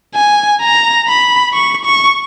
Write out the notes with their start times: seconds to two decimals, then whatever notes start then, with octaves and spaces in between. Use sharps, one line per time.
0.15 G#5
0.62 A#5
1.08 B5
1.54 C#6
1.85 C#6